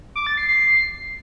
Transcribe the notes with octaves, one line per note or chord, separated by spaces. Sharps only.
D6
A6
C7
C7